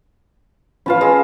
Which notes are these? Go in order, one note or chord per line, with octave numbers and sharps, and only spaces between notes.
C#4 F4 B4 F5 A5 B5
G#3 G#4 E6